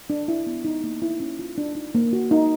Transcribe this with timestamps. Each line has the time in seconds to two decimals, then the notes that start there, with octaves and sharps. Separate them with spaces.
0.10 D4
0.28 E4
0.47 B3
0.65 D#4
0.84 A#3
1.02 E4
1.20 C#4
1.39 F4
1.58 D4
1.75 D#4
1.95 A#3
2.13 F#4
2.31 D#4